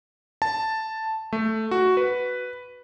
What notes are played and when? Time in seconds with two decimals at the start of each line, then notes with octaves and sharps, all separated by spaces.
0.42 A5
1.33 A3
1.71 F#4
1.97 B4